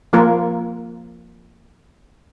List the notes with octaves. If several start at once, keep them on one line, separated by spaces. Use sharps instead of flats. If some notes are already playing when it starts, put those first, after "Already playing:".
F3 A#3 F4 A#4